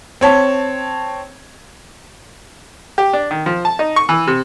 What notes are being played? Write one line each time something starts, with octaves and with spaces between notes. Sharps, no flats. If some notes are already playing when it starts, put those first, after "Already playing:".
C4 C#5 A5
G4
D4
D#3
F3
A5
D#4
C#6
E3
C3